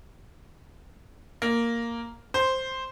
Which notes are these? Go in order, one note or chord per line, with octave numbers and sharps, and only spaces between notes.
A#3
C5